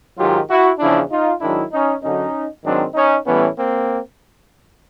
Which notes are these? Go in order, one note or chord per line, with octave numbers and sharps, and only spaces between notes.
G#2 D#3 F#3 F4 G4
E4 F#4
E2 C#3 F3 D4 E4
D#4 F4
G#2 D#3 F#3 D4 E4
C#4 D#4
F#2 D3 F#3 C#4 D#4
G#2 D#3 F#3 C4 D4
C#4 D#4
A2 E3 G3 B3 C#4
A#3 C4